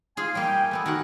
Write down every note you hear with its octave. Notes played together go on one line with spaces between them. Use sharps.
G#3 F4 G#4 G#5
G3 A#3 G5
A3 B3 A4
D#3 F#4 A#4 F#5